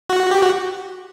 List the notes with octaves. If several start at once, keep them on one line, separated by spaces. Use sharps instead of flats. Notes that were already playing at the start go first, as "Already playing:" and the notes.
F#4
G4
F#4